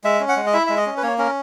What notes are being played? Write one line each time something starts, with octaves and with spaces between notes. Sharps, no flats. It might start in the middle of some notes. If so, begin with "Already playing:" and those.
G#3 E5
C#4
F#5
G#3
D#5
E4 E5
G#3 E5
D#5
C#4
B4
A#3 C#5
C#4 A#4